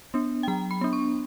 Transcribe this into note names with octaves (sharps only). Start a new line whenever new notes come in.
B3 D4
G5
F#3 A#5
B5
B3 D4
C#6